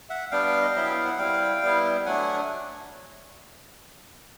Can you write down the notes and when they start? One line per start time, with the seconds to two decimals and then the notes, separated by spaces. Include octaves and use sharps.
0.10 E5 F#5
0.31 G3 B3 D4 F5 G5
0.62 D#5
0.75 F#3 B3 E4 E5
0.91 F5
1.05 F#5
1.18 G3 C4 E4 F5 G5
1.62 G3 B3 E4
2.06 F#3 A3 D4 F#5 G#5